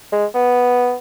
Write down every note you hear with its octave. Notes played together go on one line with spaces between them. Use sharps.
G#3
B3